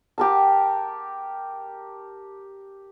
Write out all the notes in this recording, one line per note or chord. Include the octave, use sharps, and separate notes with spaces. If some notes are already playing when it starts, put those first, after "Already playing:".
G4 A#4 A5